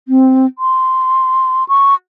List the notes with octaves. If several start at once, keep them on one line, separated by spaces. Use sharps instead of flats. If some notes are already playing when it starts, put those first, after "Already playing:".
C4
C6
C#6